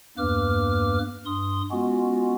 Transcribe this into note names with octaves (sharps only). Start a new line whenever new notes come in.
E2 G2 A#3 B4 D6 F6
G2 C6 D#6
G#3 B3 C#4 F4 F#4